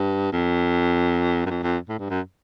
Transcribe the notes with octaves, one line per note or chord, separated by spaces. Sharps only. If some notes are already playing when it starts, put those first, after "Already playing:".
Already playing: G2
F2
F#2
F2
F2
A2
G2
F#2